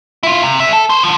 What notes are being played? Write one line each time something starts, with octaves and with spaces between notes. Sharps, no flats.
E4 F4
C3
D3 E5
A4
B4 C5
D3 F3